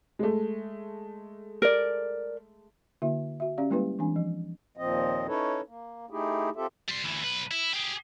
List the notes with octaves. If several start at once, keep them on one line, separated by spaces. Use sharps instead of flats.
G#3 A3
A#4 D5
D3 A#3 E4 F#4 E5
F#4 E5
C#4 G4 D5 F5
G3 G#3 A#3 E4 G4 B4
E3 G#3 C4 D4 G#5
F3
D#2 A#2 F3 C4 D#5
C#4 D#4 E4 A4 B4 C#5
A#3
A3 D#4 E4 G4 G#4
C4 F4 G4 A4 E5
G3 C6
D2 E3
B1 B4
E4
G4 G#4